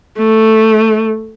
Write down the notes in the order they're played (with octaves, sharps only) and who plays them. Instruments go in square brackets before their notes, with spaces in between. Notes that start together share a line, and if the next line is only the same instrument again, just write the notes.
[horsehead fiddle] A3